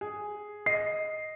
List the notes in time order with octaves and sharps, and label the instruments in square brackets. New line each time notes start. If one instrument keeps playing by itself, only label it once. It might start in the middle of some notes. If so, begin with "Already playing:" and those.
[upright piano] G#4
[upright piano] D#5 [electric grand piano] C7